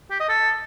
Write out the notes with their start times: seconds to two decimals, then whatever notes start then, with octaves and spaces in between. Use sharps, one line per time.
0.11 G4
0.20 D#5
0.29 A4